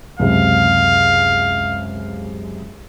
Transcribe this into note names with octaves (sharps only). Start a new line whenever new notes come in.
C#2 F#2 C3 F5